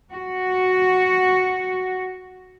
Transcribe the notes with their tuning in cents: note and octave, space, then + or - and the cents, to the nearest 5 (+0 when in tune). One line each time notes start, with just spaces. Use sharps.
F#4 +0